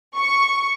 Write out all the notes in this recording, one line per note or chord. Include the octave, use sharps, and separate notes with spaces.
C#6